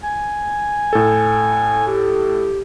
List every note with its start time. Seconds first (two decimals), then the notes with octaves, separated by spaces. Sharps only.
0.04 G#5
0.93 A2 A4
1.87 G4